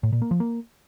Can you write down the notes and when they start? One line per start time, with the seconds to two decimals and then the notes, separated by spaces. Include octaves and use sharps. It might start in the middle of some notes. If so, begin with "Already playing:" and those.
0.03 A2
0.12 A#2
0.22 A#3
0.31 F3
0.40 A#3